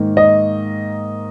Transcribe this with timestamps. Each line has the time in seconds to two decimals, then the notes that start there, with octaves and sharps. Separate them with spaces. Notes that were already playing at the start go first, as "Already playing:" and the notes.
Already playing: G#2 D#3 A#3
0.17 D#5